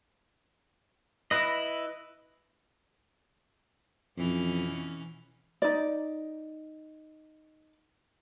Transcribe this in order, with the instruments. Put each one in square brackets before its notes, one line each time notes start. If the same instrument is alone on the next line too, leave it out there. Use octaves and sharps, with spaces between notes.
[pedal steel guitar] E4 B4 D#5
[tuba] F2 [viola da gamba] B2 E3 C#4
[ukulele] D#4 D5